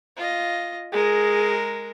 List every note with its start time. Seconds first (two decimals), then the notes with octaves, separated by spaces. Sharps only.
0.17 F4 D#5
0.92 G#3 G#4 A#4